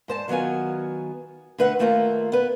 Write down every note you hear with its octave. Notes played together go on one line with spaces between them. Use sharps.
G#2 C5 A5
D#3 F#3 B3 F4 G#5
D3 A3 B4 E5 F#5
D#2 A3 A#3 F4 E5 A#5
B3 B4